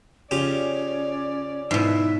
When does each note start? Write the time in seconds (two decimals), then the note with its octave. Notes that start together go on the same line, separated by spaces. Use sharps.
0.31 C#3 C#4 F4 G4 D5
1.71 G#2 B2 E4 E5